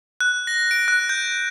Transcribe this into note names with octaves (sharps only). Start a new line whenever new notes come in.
F#6
A#6
D7
F#6
G6